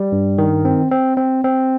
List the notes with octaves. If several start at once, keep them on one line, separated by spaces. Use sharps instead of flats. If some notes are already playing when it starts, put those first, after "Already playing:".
Already playing: G3
G2
D#3
C4
C4
C4
C4